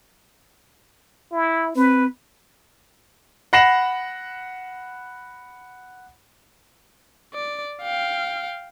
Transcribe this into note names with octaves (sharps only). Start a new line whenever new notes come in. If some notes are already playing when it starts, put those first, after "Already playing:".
E4
C4 B4
F#5 B5 A#6 C7 E7 F#7
D5
F5 G5